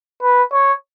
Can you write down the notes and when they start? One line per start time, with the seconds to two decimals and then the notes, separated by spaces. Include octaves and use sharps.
0.23 B4
0.52 C#5